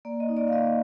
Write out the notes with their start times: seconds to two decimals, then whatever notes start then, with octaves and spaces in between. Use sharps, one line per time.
0.05 A#3 D5
0.20 D#5
0.29 D#4
0.37 D5
0.48 F5
0.53 A#3 D#5